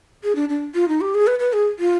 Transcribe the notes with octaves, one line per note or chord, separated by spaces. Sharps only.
G#4
D4
D4
F4
D#4
G4
G#4
B4
B4
G#4
F4